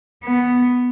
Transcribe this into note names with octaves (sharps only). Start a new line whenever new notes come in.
B3